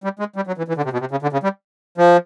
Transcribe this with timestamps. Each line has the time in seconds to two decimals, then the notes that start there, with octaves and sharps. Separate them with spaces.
0.04 G3
0.19 G#3
0.36 G3
0.47 F#3
0.58 E3
0.68 E3
0.77 D3
0.84 C3
0.93 B2
1.00 C3
1.11 C#3
1.22 D3
1.33 C#3
1.43 G3
1.98 F3